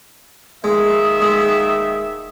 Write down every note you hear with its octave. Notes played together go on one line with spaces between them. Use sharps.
D1 D#3 G#3 A#3 E5 D#6
G#3